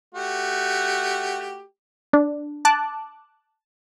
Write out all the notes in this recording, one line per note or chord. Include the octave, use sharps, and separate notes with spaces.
A3 F#4 G4
D4
A5 D6 F#6